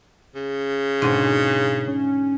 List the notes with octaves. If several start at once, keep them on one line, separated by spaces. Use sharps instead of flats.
C#3
G#2 B2 D3 F#3
C#4